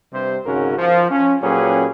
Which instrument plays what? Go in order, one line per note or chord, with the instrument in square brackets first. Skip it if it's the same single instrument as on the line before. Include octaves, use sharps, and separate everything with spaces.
[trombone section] G2 C3 C5
G#1 G#2 C#3 C#4 F#4 A#4
F3
C#4
A#2 F#3 C#4 G4 G#4 B4